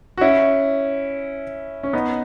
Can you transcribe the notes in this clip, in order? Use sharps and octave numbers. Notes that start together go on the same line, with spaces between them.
F#4
C#4 E4
C#4
B3 D#4